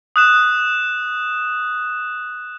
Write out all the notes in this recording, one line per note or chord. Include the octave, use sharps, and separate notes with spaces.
D#6 F#6 E7